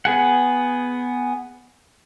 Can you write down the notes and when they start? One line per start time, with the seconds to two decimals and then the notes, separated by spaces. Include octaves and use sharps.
0.05 B3 G#4 F#5